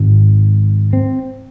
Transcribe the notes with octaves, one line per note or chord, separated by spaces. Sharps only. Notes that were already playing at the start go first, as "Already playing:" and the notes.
Already playing: G#1 G#2
C4